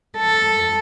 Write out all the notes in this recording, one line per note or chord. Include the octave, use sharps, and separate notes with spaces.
A4